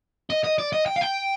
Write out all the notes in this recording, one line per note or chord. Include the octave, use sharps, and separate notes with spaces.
D#5
D#5
D5
D#5
G5
F5
G5